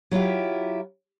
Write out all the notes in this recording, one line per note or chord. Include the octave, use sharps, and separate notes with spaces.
F#3 E4 F4 G4